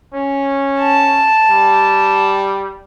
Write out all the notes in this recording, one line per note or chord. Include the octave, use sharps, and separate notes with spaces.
C#4
A5
G3